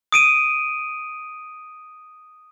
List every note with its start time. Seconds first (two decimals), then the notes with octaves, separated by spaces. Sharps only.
0.12 D#6 D7 D#7